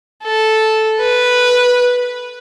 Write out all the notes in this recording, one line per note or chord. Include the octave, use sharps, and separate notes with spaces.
A4
B4